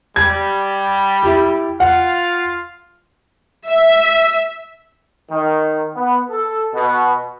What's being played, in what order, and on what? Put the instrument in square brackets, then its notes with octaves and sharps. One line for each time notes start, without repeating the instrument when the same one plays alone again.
[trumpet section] G3 [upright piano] G#6
[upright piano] E4 G4
[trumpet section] F4 F5 [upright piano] F#5
[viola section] E5
[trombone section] D#3
B3
A4
B2